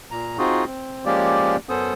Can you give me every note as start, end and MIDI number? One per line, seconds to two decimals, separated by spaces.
0.11 0.38 46
0.11 0.38 82
0.38 0.64 60
0.38 0.64 63
0.38 0.64 65
0.38 0.64 66
0.38 0.64 68
0.66 1.05 60
1.05 1.56 53
1.05 1.56 56
1.05 1.56 58
1.05 1.56 61
1.05 1.56 67
1.05 1.56 74
1.69 1.94 42
1.69 1.94 59
1.69 1.94 61
1.69 1.94 69
1.69 1.94 72
1.69 1.94 87